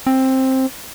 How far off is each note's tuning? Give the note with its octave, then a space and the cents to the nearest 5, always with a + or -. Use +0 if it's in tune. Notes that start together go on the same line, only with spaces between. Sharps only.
C4 +10